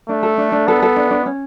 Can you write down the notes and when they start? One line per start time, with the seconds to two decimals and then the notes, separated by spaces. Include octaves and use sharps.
0.09 A3 D4
0.23 A4
0.38 D4
0.52 D4
0.67 B3 A4
0.82 A4
0.96 D4
1.11 D4
1.26 C#4